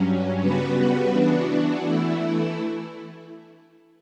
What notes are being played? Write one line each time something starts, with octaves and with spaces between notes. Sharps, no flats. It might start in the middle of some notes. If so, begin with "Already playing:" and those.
Already playing: G2 F#3 C#4
C#3 G3 B3 F#4 B4
E3 B3 D4 F#4
E3 A3 E4